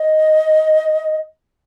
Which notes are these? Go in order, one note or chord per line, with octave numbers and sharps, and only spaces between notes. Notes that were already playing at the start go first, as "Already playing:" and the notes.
Already playing: D#5